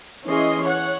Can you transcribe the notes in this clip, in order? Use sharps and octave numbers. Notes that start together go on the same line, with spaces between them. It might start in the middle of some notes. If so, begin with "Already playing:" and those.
E3 C#4 G#4 D#5 C6
C#5 F#5